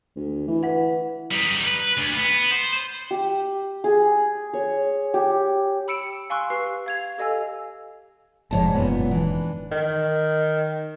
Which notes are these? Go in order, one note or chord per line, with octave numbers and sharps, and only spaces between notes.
D2
E3
B4 F#5
G3 D#4
B4
D2
B3
C5
G4
G#4
C#5
G4
B5 E6 C#7 D7 E7
F5 G#5 C6 C#6 E6 F#6
G4 B4 C7
F5 G#6 F7
G4 A4 D#5 F5 G#5 E6
F1 G#2 F3 C#5 D5 A5
F#2 A#2 B3
E3 D4
D#3